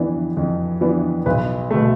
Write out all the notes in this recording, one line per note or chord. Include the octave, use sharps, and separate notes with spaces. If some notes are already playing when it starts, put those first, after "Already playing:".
Already playing: F2 E3 B3 D4
F2
E3 B3 D4
B1 B4
B2 A3